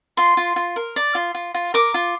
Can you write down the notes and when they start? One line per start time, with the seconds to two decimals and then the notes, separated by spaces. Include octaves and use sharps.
0.17 F4 C6
0.37 F4
0.56 F4
0.76 A#4
0.96 D5
1.15 F4
1.35 F4
1.54 F4
1.74 A#4 D6
1.94 F4